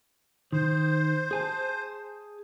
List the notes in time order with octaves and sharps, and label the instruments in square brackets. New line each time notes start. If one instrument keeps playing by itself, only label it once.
[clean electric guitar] D#3 [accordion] C5
[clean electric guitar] G#4 G#5 A5